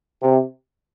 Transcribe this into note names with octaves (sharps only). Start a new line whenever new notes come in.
C3